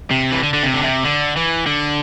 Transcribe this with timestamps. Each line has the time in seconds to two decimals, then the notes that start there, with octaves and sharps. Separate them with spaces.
0.11 C3
0.32 E3
0.43 D3
0.53 D3
0.63 C3
0.74 D3
0.84 C3
1.04 D3
1.36 E3
1.66 D3